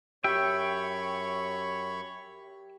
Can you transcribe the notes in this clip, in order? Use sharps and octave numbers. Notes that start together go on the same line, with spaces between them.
F#2 G4 C#5 E5 G5 B5 C#6